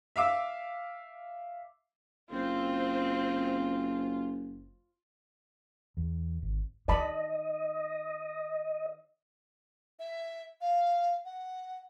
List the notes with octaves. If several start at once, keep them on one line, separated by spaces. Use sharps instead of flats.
E5 F5 D6 E6
F#1 C4 F4
E2
G#1
D#3 D5 D#5 A5 B5
E5
F5
F#5